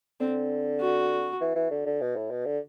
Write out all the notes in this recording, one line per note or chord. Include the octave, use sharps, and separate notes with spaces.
D3 C4
F#4
E3
E3
D3
D3
B2
A2
B2
D3